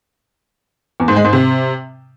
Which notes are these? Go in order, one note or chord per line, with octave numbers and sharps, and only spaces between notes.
E2
G#2
G#3
G#2
C3